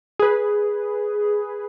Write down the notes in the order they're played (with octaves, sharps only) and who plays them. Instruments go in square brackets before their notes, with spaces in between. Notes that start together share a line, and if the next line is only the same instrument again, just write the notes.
[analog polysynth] G#4 B4